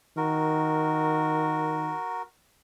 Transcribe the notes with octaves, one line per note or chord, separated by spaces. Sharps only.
D#3 F#4 A#4